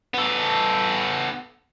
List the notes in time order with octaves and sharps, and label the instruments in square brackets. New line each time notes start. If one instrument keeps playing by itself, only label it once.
[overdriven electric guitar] B3 A4